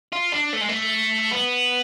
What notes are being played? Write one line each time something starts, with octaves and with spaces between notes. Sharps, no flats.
F4
D4
A3
G#3
A3
B3